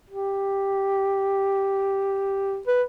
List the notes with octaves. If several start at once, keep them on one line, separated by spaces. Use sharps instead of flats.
G4
B4